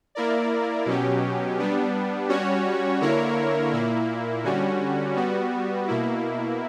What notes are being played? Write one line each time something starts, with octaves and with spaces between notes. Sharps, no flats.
A#3 E4 A#4 D5
B2 F#3 C#4 G4
G3 B3 D4
G3 C#4 F#4 C#5
D3 A#3 E4 A#4 C#5
A#2 A#3 E4
D3 G3 C#4 F#4
G3 B3 F#4
B2 A#3 E4